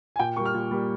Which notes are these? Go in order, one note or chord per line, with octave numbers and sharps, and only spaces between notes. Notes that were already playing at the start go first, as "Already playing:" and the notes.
G#5
A#2 G5
G3 A#3 C#6
F6
A#2
G3 A#3